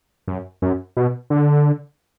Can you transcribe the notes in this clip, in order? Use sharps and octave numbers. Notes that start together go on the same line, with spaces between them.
F#2
F#2
B2
D3